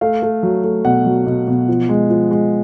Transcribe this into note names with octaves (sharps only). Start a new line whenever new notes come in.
A3 F5
A3
F#3
A3
B2 F#5
F#3
B2
B2
F3
G#3
F3
G#3